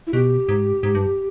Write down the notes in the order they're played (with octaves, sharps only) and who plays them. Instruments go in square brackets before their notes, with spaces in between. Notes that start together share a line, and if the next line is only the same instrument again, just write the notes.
[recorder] E4
[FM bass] B2 [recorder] G4
[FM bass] G#2
G#2
G2